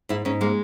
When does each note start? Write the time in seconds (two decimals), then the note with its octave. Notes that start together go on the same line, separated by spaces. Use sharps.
0.09 G#2 E4
0.25 G#2 C#4
0.41 G#3 A#3